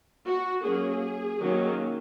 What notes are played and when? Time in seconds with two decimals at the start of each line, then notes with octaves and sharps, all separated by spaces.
0.26 F#4
0.64 F#3 A#3 C#4 G#4
1.41 D#3 F#3 A#3 C#4